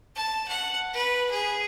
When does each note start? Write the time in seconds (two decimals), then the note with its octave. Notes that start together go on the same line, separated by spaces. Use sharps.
0.15 A5
0.48 F#5
0.94 B4
1.31 G#4